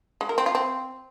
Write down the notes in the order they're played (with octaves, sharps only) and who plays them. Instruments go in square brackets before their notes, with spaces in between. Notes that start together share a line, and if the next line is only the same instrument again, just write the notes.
[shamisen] G#3
A#4
C4
F4
C4